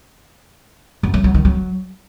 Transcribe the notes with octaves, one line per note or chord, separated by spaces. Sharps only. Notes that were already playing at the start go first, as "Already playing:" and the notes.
F#2
F#3
F#3
D#3
F#3